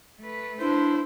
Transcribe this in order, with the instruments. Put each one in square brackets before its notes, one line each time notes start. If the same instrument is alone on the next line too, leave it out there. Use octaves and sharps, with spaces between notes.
[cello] A3 B4
[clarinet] D4 [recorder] E4 [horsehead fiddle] C5